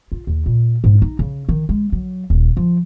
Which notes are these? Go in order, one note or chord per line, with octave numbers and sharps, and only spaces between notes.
F4
D#2
A#2
G#2
D#4
C#3
D#3
G#3
F#3
D#1
F3